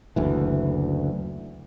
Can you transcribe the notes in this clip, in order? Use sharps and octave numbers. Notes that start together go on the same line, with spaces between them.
F#1 D2 E3